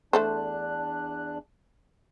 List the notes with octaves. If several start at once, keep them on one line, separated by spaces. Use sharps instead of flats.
E2 A3 D4 A4 C5 F#6